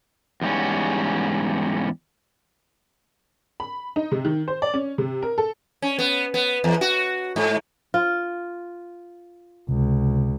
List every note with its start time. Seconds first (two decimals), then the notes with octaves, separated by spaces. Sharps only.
0.41 E2 G#2 G3 C#4
3.60 B5
3.96 D#4
4.12 C3
4.25 D#3
4.48 C5
4.62 D5
4.74 C#4
4.98 C3
5.23 A#4
5.38 A4
5.82 C#4
5.99 B3
6.34 B3
6.64 E2
6.81 F#4
7.36 G#2
7.94 F4
9.69 C#2 C3